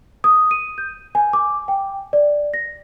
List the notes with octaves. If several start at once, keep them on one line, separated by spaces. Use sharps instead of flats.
D#6
D#7
G6
G#5
D6
G5
D5
A#6